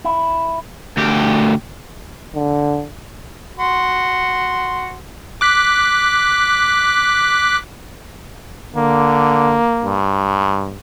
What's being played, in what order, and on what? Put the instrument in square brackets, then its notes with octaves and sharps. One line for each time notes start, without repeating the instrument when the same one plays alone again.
[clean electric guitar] E4
[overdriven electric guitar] D2 G4
[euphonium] D3
[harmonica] F#4 C6
[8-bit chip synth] D6 F#6 B6
[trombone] D3 [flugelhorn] A#3
[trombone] G2